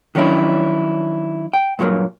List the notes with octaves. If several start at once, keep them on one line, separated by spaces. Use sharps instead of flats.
D#3 F#3 C#4 D4 E4
G5
G2 A#2 F#3 G#3 A#3